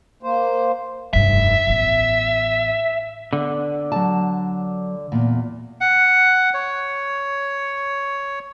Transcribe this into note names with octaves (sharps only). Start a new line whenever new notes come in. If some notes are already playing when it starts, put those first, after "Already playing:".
A#3 C5
F1 G2 E5
A1 B3
D3 B3
F#3 A5
E2 A#2
F#5
C#5